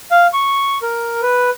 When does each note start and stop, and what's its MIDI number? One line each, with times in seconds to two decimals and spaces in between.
0.11 0.27 77
0.33 0.78 85
0.82 1.21 70
1.22 1.50 71